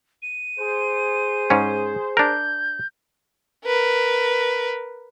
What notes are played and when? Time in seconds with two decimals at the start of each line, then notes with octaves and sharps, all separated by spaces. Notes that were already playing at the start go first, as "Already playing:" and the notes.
0.22 D#7
0.59 G#4 C5
1.50 G#2 C#4
2.17 D4 A#4 G6
3.65 A#4 B4